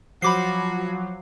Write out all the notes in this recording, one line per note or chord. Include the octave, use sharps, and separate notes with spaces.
F3 F#3 F#4 B5 D6 C7